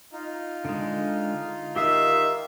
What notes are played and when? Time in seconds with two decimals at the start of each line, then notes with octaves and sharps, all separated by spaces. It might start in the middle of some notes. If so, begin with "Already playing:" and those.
0.13 D#4 F4
0.65 D3 G#3
1.76 D#3 G4 E5 F5 D#6